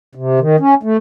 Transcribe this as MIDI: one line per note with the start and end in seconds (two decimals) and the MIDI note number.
0.15 0.40 48
0.40 0.56 51
0.60 0.74 61
0.83 0.97 57